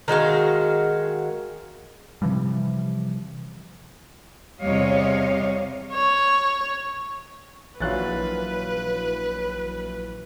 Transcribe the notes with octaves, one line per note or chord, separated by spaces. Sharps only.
D#3 G#3 F#4 F5
C3 E3 F3 G3
E2 C3 G3 C#5 D#5 F5
C#5
A#1 E3 F#3 F4 B4 F#6 A6